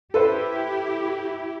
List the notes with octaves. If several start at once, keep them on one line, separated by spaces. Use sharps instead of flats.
E4 G4 A4 B4 C5